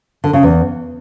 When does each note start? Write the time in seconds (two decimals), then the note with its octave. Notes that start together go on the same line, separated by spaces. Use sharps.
0.24 D3
0.33 C#3
0.43 E2